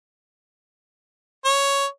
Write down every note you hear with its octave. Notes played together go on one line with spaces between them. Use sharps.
C#5